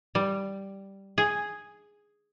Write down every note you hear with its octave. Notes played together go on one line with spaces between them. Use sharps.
G3
G#4